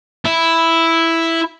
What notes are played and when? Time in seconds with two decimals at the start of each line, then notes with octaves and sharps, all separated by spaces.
0.25 E4